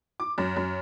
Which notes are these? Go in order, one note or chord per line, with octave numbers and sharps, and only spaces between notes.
D6
F#2
F#2